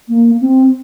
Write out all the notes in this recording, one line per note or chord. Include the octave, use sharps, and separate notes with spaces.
A#3
C4